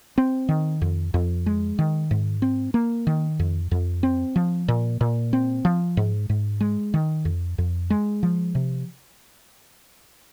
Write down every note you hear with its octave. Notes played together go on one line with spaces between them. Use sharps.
C4
D#3
F2
F2
G#3
D#3
G#2
C4
A#3
D#3
F2
F2
C4
F3
A#2
A#2
C4
F3
G#2
G#2
G#3
D#3
F2
F2
G#3
F3
C3